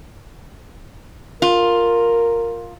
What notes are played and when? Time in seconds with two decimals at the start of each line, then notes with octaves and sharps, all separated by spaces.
1.42 F4 A#4